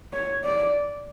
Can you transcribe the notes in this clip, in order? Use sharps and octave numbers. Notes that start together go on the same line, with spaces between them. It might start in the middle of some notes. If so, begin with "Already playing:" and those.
C#5
D5